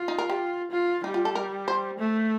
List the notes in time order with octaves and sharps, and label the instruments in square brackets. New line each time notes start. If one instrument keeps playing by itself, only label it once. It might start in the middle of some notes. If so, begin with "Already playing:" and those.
Already playing: [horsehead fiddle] F4
[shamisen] D#4
A#4
G4
[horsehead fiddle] F4
[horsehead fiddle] G3 [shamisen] D#4
[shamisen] F4
A4
A#4
C5
[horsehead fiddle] A3